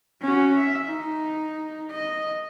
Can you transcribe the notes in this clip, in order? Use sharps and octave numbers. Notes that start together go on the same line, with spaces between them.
C#4 F#4
E5
D#4
D#5